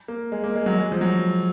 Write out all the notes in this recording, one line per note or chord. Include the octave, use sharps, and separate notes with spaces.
A#3
G#3
A#3
G#3
F#3
G#3
F3
F#3